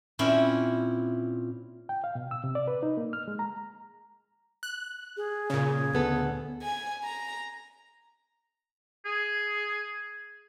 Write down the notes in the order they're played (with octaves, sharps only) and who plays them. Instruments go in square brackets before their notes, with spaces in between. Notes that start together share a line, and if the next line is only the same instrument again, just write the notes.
[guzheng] A#2 C4 C#4 E4
[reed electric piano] G5
F5
B2
E6
C3
D5
B4
D#4
A#3
F6
G#3
A#5
[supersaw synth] F#6
[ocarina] G#4
[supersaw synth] A#2 C#3
[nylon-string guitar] D2 B3 A4
[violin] G#5
A#5
[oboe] G#4